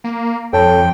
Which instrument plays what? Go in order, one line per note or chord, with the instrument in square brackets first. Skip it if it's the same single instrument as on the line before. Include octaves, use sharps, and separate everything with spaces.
[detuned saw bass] A#3
[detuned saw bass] F2 [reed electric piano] A4 C#5 A5 [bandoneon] G5